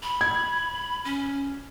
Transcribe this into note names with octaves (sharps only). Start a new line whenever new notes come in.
B5
G#6
C#4